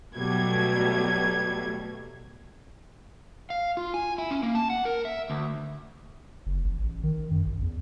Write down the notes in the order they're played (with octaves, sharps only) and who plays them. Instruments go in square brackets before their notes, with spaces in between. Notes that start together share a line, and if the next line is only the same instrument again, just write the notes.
[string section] B2 F#3 G3 A3 G#6
[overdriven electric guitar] F5
F4
G#5
E4
C#4
A#3
A5
F#5
A#4
E5
D2
[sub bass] F#1
A1
A1
D#3
F#2
A1
E2